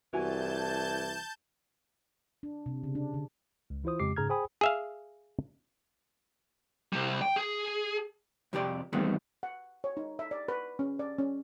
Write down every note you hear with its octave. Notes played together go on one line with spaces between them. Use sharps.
C2 E3 F#4 G#5 A5 G6
D4
C3
C#3
D4
D3
C#2
E3 E4 F4 C5 D#6
F2 C#3 G#3 G4 D6 C7
G#2 C#3 G#4 A#5 F6 G#6
G#4 C5 G5 G#5 B5 D#6
G#4 E5 F5
C3 G3
G5
G#4
F2 C3 G4 D5
E2 G2 D#3 A3 B3 C4
F#5
C#5
D#4
E5
D5
B4
C#4
D5
C#4